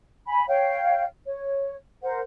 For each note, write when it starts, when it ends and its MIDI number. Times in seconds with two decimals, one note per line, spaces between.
0.28 0.45 80
0.28 0.45 83
0.48 1.05 73
0.48 1.05 77
0.48 1.05 79
1.27 1.77 73
2.02 2.21 70
2.02 2.21 72
2.02 2.21 78